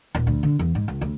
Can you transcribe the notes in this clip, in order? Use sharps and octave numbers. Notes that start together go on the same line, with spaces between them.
D#1
D2
D3
E2
G#2
C#2
D2